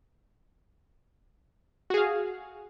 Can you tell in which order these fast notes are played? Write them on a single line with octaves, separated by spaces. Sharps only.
F#4 G#4 F5